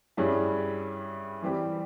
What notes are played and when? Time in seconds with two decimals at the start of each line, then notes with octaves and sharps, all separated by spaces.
0.17 G2 G3 C#4 E4 G#4
1.42 E3 G3 C4 G4